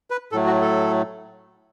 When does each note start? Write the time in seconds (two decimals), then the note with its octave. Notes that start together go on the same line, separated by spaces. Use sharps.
0.10 B4
0.32 A2 F#3 A3 A4
0.46 F#4
0.61 A4